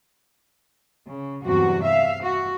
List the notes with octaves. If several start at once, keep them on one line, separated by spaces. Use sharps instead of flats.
C#3
E2 G2 C3 F#3 F#4
E5 F5
F#4